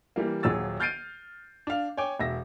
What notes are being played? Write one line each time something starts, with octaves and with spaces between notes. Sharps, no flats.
E3 G3 A#3
D#1 F#3 G#4 E6 A6
F6 G6 A6 C7 D7 D#7
D4 F5
C#5 G5 G#5 D6
E1 E5 A#6